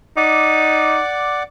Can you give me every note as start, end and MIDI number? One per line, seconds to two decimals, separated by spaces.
0.17 0.99 63
0.17 1.43 74
0.17 1.43 78
0.17 1.43 86